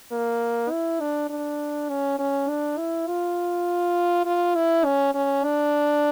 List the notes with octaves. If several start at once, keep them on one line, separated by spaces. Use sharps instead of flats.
A#3
E4
D4
D4
C#4
C#4
D4
E4
F4
F4
E4
C#4
C#4
D4